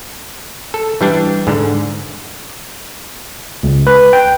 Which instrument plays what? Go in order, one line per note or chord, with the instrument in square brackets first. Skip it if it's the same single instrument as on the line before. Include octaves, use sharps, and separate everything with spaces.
[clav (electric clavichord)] A4
E3 G3 D4
G#2 D3
[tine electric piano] C#2
B4
G5